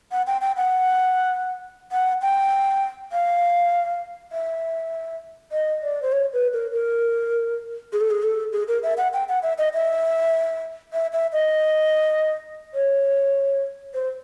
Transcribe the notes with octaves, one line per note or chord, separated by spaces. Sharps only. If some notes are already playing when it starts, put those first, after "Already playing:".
F#5
G5
G5
F#5
F#5
G5
F5
E5
D#5
D5
C5
C#5
B4
A#4
A#4
G#4
A4
G#4
A4
G#4
A#4
E5
F#5
G5
F#5
E5
D#5
E5
E5
E5
D#5
C#5
C5